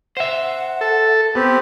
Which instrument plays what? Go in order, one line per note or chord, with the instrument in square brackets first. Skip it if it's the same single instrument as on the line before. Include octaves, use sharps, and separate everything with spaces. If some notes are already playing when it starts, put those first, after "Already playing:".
[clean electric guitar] C5 E5 [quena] F#5
[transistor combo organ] A4
[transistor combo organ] B3 [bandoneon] C4 G4